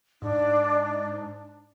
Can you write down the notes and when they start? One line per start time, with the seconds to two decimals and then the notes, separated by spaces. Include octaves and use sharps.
0.22 G#2 D4